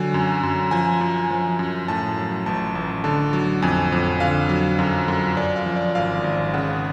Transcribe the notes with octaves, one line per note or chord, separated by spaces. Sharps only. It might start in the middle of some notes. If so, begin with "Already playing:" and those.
Already playing: D3 F#3 G#5
F#2
F#2
F3 G#5
F#2
F3
F#2
A2 A5
F#3
A1 A5
A1
D3 A5
F#3
F2 G#5
F2
D3 F5
F#3
F#2
F#2
F#2 D5
F5
F3
D5
G#1 F5
G#1
C#3 F#5